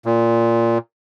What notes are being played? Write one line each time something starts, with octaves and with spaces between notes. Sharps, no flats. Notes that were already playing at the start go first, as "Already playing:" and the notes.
A#2